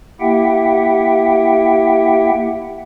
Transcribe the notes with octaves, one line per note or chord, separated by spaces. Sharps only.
A#3 E4 G4 E5 F#5 G5